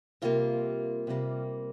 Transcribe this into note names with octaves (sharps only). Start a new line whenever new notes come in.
C3 G3 A#3 F4
C3 G3 A#3